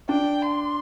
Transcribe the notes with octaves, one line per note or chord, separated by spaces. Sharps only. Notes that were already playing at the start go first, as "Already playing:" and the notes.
D4 G5
C6